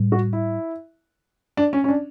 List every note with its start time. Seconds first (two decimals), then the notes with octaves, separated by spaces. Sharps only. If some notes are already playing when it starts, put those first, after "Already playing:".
Already playing: A2 G3
0.12 F#4
0.33 E4
1.57 D4
1.73 C#4
1.84 C#4
1.89 D4